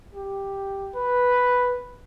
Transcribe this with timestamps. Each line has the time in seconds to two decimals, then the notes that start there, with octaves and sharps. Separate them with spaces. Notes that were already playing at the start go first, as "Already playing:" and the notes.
0.13 G4
0.95 B4